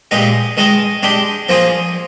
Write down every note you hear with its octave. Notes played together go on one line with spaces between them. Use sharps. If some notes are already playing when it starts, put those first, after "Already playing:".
A#2 G#3 D#4 G4
D#3 G#3 D#4
G#3 D4 G4
F3 A#3 F4 G#4